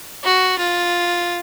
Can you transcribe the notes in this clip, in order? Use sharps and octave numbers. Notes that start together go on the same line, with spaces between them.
F#4
F4